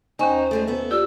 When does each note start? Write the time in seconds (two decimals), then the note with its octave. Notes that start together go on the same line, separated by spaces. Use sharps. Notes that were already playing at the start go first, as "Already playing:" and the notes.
0.19 D#2 C#4 D#4 C5 G#5
0.51 A#2 G#3 A3
0.67 B3 E5
0.91 F4 G4 D5 E6